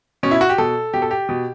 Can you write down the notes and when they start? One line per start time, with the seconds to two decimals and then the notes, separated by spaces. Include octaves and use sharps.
0.23 B2 C#4
0.31 E4
0.41 F#4
0.49 G4
0.58 B2 A4
0.93 B2 G4
1.02 A4
1.11 G4
1.29 B2